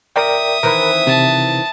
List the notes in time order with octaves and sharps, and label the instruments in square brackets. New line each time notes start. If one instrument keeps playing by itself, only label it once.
[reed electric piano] A#4 D5 G5 [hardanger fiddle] E5 D#6
[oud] D#3 E3 C4 [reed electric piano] A#4 B5
[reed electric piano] C3 [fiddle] A5